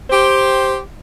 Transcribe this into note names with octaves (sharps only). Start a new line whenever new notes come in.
G4 C5